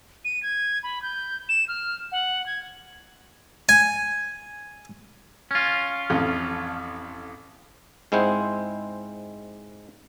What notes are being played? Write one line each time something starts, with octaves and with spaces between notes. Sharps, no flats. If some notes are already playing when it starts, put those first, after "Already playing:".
D#7
G#6
B5
G6
E7
F6
F#5
G#6
G#5
C#4 F4
A1 F2
G#2 G#3 C4 E4 C5 F#5